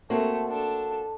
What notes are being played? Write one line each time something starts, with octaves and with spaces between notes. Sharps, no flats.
A3 A#3 C4 F#4 A5
D4 A4 A5